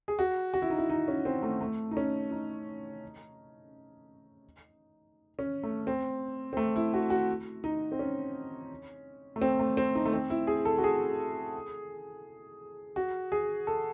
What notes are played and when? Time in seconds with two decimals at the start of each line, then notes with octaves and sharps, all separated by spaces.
0.08 G#4
0.19 F#4
0.54 F#4
0.62 E4
0.70 D#4
0.78 E4
0.89 D#4
1.08 C#4
1.25 C4
1.43 A3
1.61 A3
1.91 D#4
1.97 C#4
2.31 D#4
5.39 C#4
5.63 A3
5.87 C4
6.53 C4
6.57 A3
6.76 E4
6.94 F#4
7.10 F#4
7.64 D#4
7.92 C4
7.99 C#4
9.36 A3
9.42 C4
9.59 A3
9.77 C4
9.95 D#4
10.05 A3
10.13 C4
10.30 E4
10.47 G#4
10.65 A4
10.78 F#4
10.84 G#4
12.96 F#4
13.32 G#4
13.67 A4